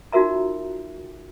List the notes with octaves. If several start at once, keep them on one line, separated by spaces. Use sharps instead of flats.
D#4 F4 F#4 A#4 E5 A#5